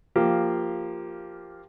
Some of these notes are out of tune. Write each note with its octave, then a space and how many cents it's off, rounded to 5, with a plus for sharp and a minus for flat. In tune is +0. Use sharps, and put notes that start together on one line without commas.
F3 -5 A#3 +0 G4 +0